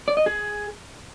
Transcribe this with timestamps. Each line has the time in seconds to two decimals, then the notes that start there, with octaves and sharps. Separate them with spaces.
0.08 D5
0.17 D#5
0.26 G#4